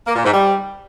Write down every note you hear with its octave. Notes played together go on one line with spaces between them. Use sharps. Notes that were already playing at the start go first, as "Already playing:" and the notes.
A#3
A#2
G#2
G3